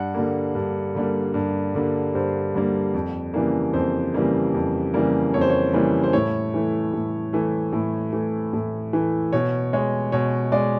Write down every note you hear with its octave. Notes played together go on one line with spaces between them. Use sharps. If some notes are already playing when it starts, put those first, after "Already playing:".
Already playing: G2 F#5
D3 G3 A#3
G2
D3 G3 A#3
G2
D3 G3 A#3
G2 C5
D3 G3 A#3
F2
C#3 E3 G3 A#3
F2 C5
C#3 E3 G3 A#3
F2
C#3 E3 G3 A#3
F2 C#5
C5
C#5
C#3 E3 G3 A#3
C5
A2 C#5
E3 A3
A2
E3 A3
A2
E3 A3
A2
E3 A3
B2 C#5
G#3 C#5
B2 C#5
G#3 D5